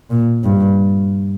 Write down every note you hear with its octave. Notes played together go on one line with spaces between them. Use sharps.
A#2
G2